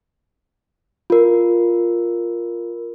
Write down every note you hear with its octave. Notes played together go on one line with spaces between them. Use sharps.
F4 A#4